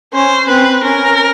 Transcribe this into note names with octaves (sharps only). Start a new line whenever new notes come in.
C#4 C5
C4 B4
C#4 A#4